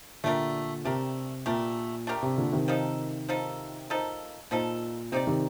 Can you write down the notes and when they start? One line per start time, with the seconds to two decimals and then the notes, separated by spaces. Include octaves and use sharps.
0.24 A#2 D3 A3 D4 G4 A#4
0.85 C3 A3 D4 G4 A#4
1.46 A#2 A3 D4 G4 A#4
2.07 A3 D4 G4 A#4
2.23 C3
2.37 A#2 D3
2.52 C3 D#3
2.68 F3 A#3 D#4 A4
3.29 F3 A#3 D#4 A4
3.90 F3 A#3 D#4 A4
4.51 A#2 F3 A#3 D#4 A4
5.12 C3 C4 D#4 G4 D5
5.27 C3 D#3